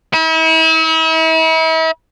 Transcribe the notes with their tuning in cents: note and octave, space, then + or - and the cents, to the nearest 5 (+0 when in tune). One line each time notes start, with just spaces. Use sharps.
E4 -40